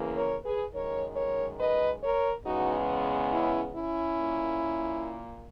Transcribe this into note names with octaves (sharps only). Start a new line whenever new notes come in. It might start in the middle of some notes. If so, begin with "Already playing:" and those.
Already playing: E2 C#3 E3 A#3
A#4 C#5
G#4 B4
F#2 D#3 G#3 A#4 C#5
A#4 C#5
B4 D#5
A#4 C#5
E2 C#3 G#3 B3 D#4 F#4
C#4 E4
C#4 E4
A#2 A#3